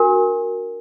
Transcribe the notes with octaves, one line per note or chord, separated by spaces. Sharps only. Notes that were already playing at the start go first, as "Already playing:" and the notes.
Already playing: D4 F#4 A#4